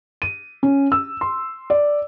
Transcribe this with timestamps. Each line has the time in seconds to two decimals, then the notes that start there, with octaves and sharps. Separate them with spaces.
0.22 D#7
0.63 C#4
0.92 E6
1.21 C6
1.70 D5